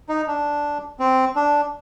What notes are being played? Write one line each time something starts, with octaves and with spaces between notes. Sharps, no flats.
D#4
D4
C4
D4